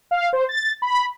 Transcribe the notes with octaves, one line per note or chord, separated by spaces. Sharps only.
F5
C5
A6
B5